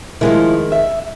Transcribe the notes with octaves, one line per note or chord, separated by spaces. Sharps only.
D#3 F3 G#3 E4
E5